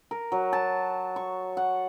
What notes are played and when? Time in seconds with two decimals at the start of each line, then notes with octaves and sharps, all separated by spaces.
0.11 A#4
0.32 F#3
0.53 A5
1.16 C#6
1.57 F#5